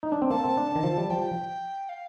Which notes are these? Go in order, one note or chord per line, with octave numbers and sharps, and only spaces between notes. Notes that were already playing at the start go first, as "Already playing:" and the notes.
D#4
D4
C4
A#3 A5
C4
D4
D#3
F3
G3
F3 G5
F5